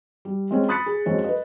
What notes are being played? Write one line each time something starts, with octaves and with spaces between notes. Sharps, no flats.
G3
G#3 C4 C#4
B5 D#6 F#6 A6 B6 C#7
G#4
F2 F#3 G#3 C#4
B4 D#5